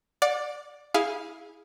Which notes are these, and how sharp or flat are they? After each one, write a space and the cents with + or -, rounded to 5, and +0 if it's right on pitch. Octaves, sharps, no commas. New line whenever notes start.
D5 +5 F#5 -40
E4 -15 G#4 +0 F5 +0